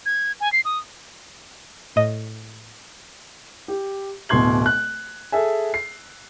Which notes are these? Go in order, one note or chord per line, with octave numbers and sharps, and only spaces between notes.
G#6
G#5
C7
D#6
A2 D#5
G4
D1 B2 C6 G#6 F#7
F#6
G#4 A4 E5 G#5
C7